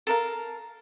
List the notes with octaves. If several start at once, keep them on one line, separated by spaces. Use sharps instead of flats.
A4 A#4 F5